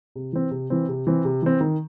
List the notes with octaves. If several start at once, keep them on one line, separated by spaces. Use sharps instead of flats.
C3
E3 C4
C3
E3 C4
C3
E3 C4
C3
E3 C4
D#3